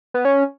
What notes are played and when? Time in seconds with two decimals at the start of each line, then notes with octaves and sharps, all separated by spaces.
0.14 B3
0.25 C#4